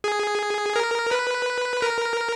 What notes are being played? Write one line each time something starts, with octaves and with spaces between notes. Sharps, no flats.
G#4
A#4
B4
A#4